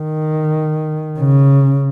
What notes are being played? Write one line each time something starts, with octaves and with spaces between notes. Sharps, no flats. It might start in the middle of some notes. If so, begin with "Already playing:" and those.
Already playing: D#3
C#3